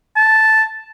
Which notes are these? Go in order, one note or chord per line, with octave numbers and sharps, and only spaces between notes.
A5